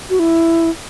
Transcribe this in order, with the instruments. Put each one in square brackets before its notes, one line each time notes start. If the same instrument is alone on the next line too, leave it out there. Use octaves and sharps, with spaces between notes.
[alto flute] F#4
E4